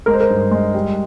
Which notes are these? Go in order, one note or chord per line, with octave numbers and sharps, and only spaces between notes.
G#3 A#4
C5
A#4
G2
G#3
G3